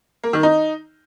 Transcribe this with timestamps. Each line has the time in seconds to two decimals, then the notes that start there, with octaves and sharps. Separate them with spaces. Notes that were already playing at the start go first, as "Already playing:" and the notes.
0.24 A#3
0.33 D#3
0.43 D#4